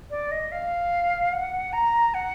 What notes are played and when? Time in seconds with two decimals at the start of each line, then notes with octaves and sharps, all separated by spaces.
0.10 D5
0.31 D#5
0.52 F5
1.33 F#5
1.73 A#5
2.14 F#5